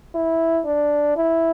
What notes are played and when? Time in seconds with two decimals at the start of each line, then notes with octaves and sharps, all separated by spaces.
0.15 E4
0.66 D4
1.17 E4